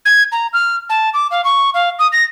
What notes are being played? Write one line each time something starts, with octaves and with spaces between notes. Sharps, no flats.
G#6
A#5
F6
A5
D6
F5
C#6
F5
D#6
A#6